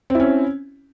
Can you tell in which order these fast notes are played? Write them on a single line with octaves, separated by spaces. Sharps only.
C4 E4 C#4